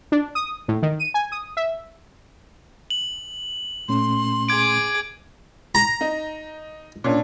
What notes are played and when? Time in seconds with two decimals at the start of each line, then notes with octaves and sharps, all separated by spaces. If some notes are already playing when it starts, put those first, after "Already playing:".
0.12 D4
0.35 D#6
0.68 A2
0.82 D#3
0.99 D#7
1.14 G#5
1.32 D#6
1.57 E5
2.90 F#7
3.89 A#2 A3 C#4 C6
4.49 G#4 D6 G#6 D7
5.75 A#5
6.01 D#4
7.04 A#2 C#4 D4